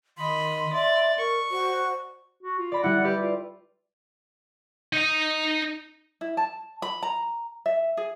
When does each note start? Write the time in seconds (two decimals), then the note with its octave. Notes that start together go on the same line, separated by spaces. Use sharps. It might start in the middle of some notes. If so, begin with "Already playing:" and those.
0.18 D#3 D#5 B5 C6
0.73 D5 E5
1.18 A#4 C#6
1.51 F#4 C5
2.43 F#4
2.59 F4
2.72 D5 B5 A#6
2.84 G3 E4 F#5
3.04 G4 B4 D5
3.21 F4
4.93 D#4 D#5
6.21 E4
6.37 A5
6.82 B5
7.03 A#5
7.66 E5
7.97 G#4